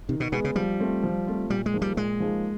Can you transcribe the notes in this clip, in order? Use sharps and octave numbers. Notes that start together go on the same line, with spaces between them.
C3 D#3
B2
B2 G#3 B3
C#3
F3 G3
A3 C4 F4
F3
A3 C4 F4
A#2 G3
G#3
F3 A#3 D#4 G#4
G3
A#2 G#3
F3 A#3 D#4 G#4